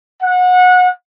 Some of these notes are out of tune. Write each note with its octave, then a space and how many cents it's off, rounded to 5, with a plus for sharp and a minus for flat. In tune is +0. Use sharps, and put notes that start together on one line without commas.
F#5 -25